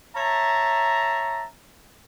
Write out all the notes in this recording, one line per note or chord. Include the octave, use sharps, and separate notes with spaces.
C#5 E5 A5 A#5